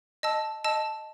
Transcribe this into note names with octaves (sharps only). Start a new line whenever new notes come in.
D#5 A5 E6
D#5 A5 E6